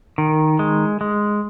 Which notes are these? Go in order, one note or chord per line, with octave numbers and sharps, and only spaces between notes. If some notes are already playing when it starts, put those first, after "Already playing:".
D#3
G#3
G#3